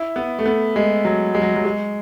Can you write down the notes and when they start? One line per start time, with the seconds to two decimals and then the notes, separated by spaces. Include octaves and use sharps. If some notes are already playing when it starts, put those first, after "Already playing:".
Already playing: E4
0.16 B3
0.39 A3
0.46 B3
0.76 G#3
1.05 F#3
1.35 G#3
1.42 F#3
1.56 F#3
1.65 G#3